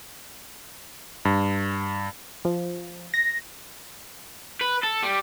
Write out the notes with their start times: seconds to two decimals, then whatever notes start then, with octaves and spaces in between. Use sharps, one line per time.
1.25 G2
2.45 F3
3.14 A#6
4.61 B4
4.83 A4
5.03 G3